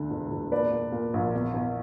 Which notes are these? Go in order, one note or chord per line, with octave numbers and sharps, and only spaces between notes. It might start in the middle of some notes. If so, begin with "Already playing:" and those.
Already playing: D2 D3
E1
E1
A#2 B4 D5
A#2
A#2
A#1
E2
E2